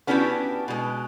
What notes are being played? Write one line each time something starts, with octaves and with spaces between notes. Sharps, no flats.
B3 C#4 D4 E4 F#4 G4
B2 G#3